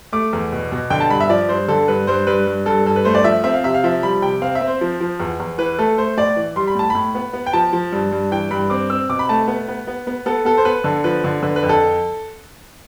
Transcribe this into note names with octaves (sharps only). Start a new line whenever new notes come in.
A3 D6
E2
B2
B2
D3 G5
A5
G2 B5
E5
F3 D5
G2 C5
D3 A4
G2 B4
G2 C5
G2 B4
G2
G2 A4
G2 A4
B4
A3 C5
D5
F3 E5
C4 E5
F5
C3 E5
F5
F3 E5
G3 B5
C3 G5
C4 F5
E5
C4
C5
F3
F3
E2
E2
E3 B4
A3 A4
A3 C5
A2 D5
E3
G3 C6
B5
A2 A5
A2 B5
B3
B3
G5
F3 A5
F3
G2
G2
E3 G5
G2 B5
C4 D6
C4 E6
B2 D6
B5
A3 A5
B3
B3
B3
B3
B3 A4
B3 A4
C5
B3 B4
D3 A4
F3 B4
D3
D3 B4
B4
F2
A4